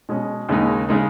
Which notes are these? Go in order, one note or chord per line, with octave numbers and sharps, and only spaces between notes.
B2 G#3 C#4
D#2 C#3 G#3 D#4
C#3 G#3 D#4